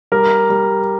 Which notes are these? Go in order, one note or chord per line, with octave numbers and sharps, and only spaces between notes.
G3 A#4
G3